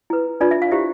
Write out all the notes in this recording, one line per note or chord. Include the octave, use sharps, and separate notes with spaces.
E4 B4
D4 F4 B4 D5
E5
F5
E4 G4 C5 E5